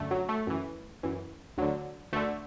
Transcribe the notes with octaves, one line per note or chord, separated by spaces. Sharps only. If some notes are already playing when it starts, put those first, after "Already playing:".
Already playing: F#2 D3 A3
F#3
A3
F#2 E3
F#2 E3
D2 D3 F#3
D2 D3 A3